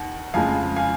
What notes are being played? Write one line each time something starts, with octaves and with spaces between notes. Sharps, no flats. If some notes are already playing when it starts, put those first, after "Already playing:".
Already playing: D#2 D#3 F#5
F2 C#3 G#3 F5 G#5
F5 G#5